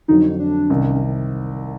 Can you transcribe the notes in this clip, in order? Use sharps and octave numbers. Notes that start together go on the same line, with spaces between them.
F2 D3 F#3 D#4
D4
C2 C3 D#3 C#4